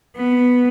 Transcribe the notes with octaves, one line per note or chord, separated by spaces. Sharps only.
B3